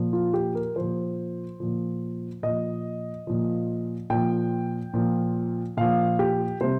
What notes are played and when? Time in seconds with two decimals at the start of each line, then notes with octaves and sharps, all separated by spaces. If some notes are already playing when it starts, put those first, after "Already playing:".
Already playing: A#2 F3
0.13 F4
0.34 G4
0.55 A#4
0.76 A#2 F3 C5
1.60 A#2 F3
2.43 A#2 F3 D#5
3.27 A#2 F3
4.10 A#2 F3 G5
4.94 A#2 F3
5.77 A#2 F3 F5
6.19 G4
6.61 C3 G3 C5